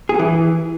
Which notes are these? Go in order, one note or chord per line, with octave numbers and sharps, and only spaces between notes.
G#4
F#3
E3